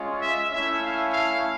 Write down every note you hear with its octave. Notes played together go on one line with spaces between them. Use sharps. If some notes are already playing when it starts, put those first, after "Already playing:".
Already playing: G#3 C#4 F4
E5
A3 C#4 E4 E5
F5
F5